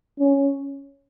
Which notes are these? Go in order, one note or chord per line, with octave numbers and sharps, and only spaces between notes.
C#4